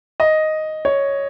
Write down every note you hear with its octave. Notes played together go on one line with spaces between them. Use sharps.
D#5
C#5